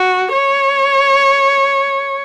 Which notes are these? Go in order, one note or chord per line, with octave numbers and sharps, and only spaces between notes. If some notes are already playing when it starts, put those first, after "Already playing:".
Already playing: F#4
C#5